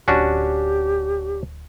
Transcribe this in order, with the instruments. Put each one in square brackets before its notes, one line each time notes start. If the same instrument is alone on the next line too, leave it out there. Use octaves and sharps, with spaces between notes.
[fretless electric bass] D1 [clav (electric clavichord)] C#4 D4 F#4 [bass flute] G4